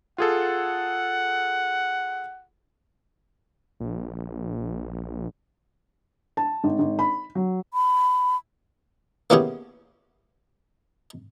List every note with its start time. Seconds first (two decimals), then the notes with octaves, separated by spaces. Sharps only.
0.18 F4 G#4 A4 F#5
3.80 A#1
6.37 A5
6.64 G#1
6.79 G#1
6.99 B5
7.35 F#3
7.74 B5
9.30 A#3 B3 C#4 E4 G4 G#4